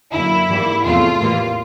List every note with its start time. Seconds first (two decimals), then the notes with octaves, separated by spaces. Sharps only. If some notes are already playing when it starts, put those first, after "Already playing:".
0.12 F#2 D3 F#3 A#3 E4
0.48 G#2 E3 G3 A#3
0.84 E2 C3 F3 A3 F4
1.20 A2 E3 G3 A#3